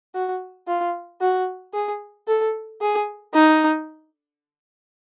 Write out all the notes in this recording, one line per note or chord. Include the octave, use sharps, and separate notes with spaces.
F#4
F4
F#4
G#4
A4
G#4
D#4